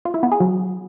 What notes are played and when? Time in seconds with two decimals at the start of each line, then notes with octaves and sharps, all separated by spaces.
0.05 F4
0.14 E4
0.23 B3
0.32 G#4
0.40 F#3